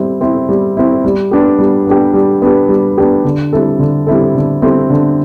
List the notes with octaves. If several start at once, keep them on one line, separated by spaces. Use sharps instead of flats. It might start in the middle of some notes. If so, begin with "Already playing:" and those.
Already playing: G3 C4 E4
C4 E4
G3
C4 E4
G3
B3 D4 G4
G3
B3 D4 G4
G3
B3 D4 G4
G3
B3 D4 G4
D3
G3 C4 E4 A4
D3
G3 C4 E4 A4
D3
G3 C4 E4 A4
D3